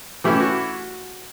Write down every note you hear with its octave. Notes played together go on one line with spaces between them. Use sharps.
E3 A3 C#4 E4 G4
F#4